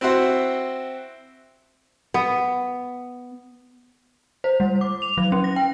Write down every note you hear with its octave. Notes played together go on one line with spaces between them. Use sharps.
C4 E4 F#4 C5
B3
C5
G3
D6
F7
F#3
C#4
A#6
G5